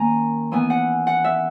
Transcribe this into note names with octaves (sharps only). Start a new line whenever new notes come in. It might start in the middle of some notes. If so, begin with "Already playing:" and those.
Already playing: D#3 A#3 C#4 G#5 A#5
E3 B3 G#5
F#5
F#5
E5